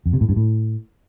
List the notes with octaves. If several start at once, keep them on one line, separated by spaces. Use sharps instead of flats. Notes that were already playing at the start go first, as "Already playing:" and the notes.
F2
C3
A2
G2
A2